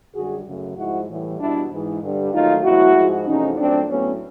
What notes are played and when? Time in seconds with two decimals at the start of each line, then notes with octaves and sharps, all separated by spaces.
0.14 F#2 D3 G3 F#4 G#4
0.45 F#2 C#3 F#3 A3
0.77 G#2 F3 G#3 E4 F#4
1.08 A2 E3 G3
1.39 B2 G3 D4 E4
1.70 G#2 E3 G#3
2.02 G2 D3 G3
2.33 D#2 D#3 F#3 A3 D#4 F4
2.64 E2 B2 F#3 A3 E4 F#4
2.95 G#2 F3 G#3
3.26 E2 C3 F3 A3 C#4 D#4
3.57 A#2 F#3 A3 C4 D4
3.89 A2 F#3 A3 B3 C#4